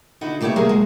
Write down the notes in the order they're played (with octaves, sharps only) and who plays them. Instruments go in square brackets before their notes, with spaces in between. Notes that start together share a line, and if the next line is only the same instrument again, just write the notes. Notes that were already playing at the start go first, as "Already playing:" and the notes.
[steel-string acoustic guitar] D3 D#4 E4 F#4
C#3 A3 G4 A4 C#5 E5
F#3 A3 A#3 G#4 A#4
G#3